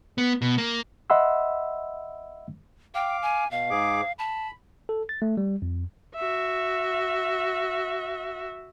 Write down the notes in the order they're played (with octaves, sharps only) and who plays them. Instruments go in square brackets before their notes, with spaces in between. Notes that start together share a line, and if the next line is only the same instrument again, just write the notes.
[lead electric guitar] B3
B2
A#3
[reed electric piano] D#5 E5 F#5 B5 C6 E6
[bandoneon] F5 D6 [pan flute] G5
[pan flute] G#5
[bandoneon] B2 [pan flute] F5
[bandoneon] G#2 G#4 D6
[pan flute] A5 [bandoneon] B5
[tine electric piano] A4
A6
A3
G3
F2
[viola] F#4 E5